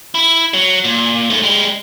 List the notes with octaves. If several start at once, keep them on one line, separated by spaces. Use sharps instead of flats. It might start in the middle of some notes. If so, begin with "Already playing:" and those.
E4
F#3
A#2
G#2 A3
G3 G#3